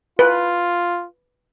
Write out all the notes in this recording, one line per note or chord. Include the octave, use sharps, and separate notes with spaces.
F4 B4